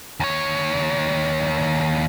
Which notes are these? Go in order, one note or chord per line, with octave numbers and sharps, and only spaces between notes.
D#2 C#5